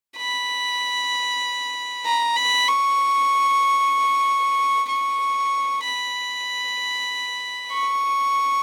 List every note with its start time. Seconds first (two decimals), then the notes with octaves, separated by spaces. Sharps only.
0.17 B5
2.05 A#5
2.37 B5
2.68 C#6
4.89 C#6
5.83 B5
7.72 C#6